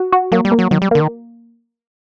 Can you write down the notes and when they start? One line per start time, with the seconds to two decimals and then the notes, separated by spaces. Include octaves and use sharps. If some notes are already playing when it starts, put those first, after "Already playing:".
Already playing: F#4
0.12 F#4
0.32 F#3 A#3
0.45 G3
0.52 A#3
0.59 F#3
0.71 D#3 F#3
0.82 G3
0.91 D3 A#3
1.01 D#3